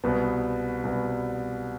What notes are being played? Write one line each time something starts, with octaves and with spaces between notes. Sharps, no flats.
C2 B2 B3
C2 B2 B3